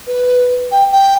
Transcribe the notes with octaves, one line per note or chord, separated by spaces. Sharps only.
B4
G5
G5